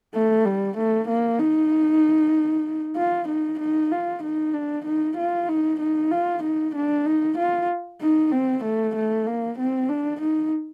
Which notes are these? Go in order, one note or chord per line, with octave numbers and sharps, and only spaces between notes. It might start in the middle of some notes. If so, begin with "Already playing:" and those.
A3
G3
A3
A#3
D#4
F4
D#4
D#4
F4
D#4
D4
D#4
F4
D#4
D#4
F4
D#4
D4
D#4
F4
D#4
C4
A3
A3
A#3
C4
D4
D#4